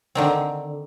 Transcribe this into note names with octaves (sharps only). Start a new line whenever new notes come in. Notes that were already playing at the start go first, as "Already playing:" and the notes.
D3 D#3 C4